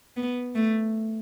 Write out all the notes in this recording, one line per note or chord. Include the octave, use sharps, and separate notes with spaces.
B3
A3